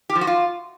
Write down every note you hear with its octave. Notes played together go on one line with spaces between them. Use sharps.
G4
F3
F#4
F4